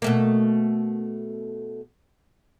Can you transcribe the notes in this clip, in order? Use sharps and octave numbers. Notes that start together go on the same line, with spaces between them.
B2 A3 A#3